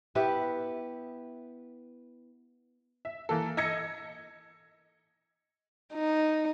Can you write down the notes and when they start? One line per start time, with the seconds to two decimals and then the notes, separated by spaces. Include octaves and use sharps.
0.15 B3 E4 G4 B4
3.05 E5
3.29 E3 A#3 A4
3.57 D#5 E6 G#6 A#6 C#7
5.94 D#4